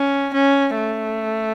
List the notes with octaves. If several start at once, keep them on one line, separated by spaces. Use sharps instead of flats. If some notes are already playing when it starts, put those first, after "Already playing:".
Already playing: C#4
C#4
A3